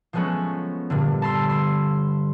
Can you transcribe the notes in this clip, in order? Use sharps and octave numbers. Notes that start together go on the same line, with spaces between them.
F3 F#3 G#3 A3 B3 C#4
G2 A#2 D3
A5 B5 C6 E6
B5 C6 E6